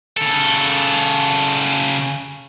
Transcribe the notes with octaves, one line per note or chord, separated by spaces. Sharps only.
C#3 A4